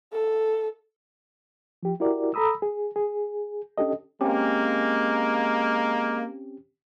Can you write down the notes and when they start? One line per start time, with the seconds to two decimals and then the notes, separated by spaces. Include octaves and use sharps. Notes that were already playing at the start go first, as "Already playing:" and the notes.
0.13 A4
1.83 F3 G4
2.00 E4 F#4 G4 A#4 D5
2.34 A4 A#5 B5 D#6 E6
2.62 G#4
2.96 G#4
3.78 C#4 D4 G4 A4 D#5
4.21 G#3 A#3 C4 C#4 G4